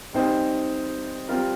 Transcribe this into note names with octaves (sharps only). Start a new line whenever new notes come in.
G3 C4 D#4 C5
G3 C4 F4 A#4